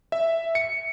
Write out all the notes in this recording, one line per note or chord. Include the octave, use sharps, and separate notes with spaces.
E5
C#7